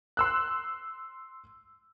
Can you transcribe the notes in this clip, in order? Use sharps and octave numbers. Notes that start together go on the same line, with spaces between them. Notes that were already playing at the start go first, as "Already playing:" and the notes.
C6 E6 F#6